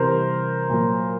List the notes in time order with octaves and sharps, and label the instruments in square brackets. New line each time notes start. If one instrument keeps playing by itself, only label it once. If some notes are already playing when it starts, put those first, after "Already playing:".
Already playing: [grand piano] C3 E3 G3 A#4 C5
A#2 F#3